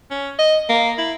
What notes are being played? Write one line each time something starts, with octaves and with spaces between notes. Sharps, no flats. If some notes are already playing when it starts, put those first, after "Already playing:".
C#4
D#5
A#3
E4